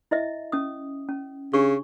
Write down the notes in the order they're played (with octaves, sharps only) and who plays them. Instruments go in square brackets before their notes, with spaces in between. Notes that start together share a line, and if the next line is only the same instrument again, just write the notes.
[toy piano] E4 D#5 E5
C#4 D#6
C#4
[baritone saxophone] C#3 [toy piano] D4 G4 C#6